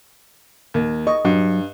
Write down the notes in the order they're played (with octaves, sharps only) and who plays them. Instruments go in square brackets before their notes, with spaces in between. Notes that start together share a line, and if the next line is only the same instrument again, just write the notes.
[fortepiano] D#2
[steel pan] D#5 [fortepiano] C#6
[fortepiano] G2 [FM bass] F#3